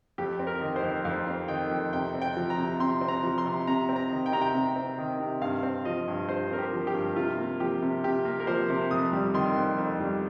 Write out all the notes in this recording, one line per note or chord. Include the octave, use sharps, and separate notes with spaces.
F2 G4
C4
A#4
D#3
C5
F2
F2 F5
C4
D#3 G5
F2
C3 G5
C4
G5
F3
A#5
C3
C3 C6
C4
A#5
F3
C6
C3
C3 A#5
C4
A#5
D#3
G5
C3 A#5
G5
C3
C4
D#3
C3
G2 F5
C4
F3 D#5
G2
G2 C5
C4 A#4
G4
F3
G4
G2
C3 F4
A#3
F3 G4
C3
C3 G4
A#3
A#4
F3 C5
C3
F2 D#6
G3
D#3 C6
F2
F2
G3